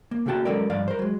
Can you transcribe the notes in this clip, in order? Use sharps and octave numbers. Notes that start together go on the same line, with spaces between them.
A#3
C#3 A3 A#3 F#4 G5 A5
F#3 G#3 C#4 A4 A#4 D5
G2 F3 D5 F5
A#4 C5
F#3 G#3